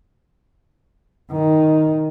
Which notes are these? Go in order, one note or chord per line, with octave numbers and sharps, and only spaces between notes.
D#3